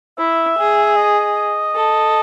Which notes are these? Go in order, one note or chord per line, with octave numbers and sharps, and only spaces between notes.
E4 E5
G#4
D#5
A4